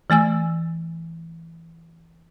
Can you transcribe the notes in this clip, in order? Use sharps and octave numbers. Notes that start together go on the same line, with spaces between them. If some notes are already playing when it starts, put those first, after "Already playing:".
E3 A3 G#5 E6